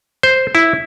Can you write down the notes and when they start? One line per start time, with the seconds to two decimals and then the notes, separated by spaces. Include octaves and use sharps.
0.23 C5
0.55 E4